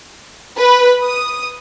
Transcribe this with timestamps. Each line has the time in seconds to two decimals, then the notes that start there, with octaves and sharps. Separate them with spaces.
0.58 B4
1.03 D#6